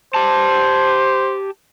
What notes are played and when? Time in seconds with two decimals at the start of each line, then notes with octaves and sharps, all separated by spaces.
0.15 G4 C5 A5